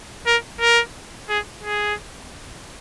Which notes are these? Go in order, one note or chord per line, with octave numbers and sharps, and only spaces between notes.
A#4
A#4
G#4
G#4